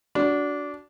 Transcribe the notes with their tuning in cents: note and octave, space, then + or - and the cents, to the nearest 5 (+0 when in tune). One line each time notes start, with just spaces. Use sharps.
D4 -20 F#4 +0